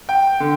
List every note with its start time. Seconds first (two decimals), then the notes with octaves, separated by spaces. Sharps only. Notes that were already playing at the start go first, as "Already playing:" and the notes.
0.09 G5
0.40 D3